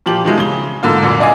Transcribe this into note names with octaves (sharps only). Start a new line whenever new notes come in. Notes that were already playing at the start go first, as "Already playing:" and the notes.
A#2 F3 G4 F#7
D#3 F3 G#3 E4
C#3 G7
G#2 D3 A#3 F4
C2 F#2 A#2
D5 D#5 F5 G#5